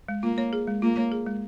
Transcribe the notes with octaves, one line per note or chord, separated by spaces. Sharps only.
G#3
A#3 F4
C#5
G#4
G#3
A#3 F4
C#5
G#4
G#3